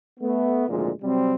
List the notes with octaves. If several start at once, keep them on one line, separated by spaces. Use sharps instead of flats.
A3 B3
G#1 D2 A#2 F3 G#3
C3 F#3 G3 C4